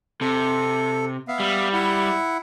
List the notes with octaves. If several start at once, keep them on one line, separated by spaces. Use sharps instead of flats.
C3 A4
B3 E5 F5
G3
E4 E5 F#5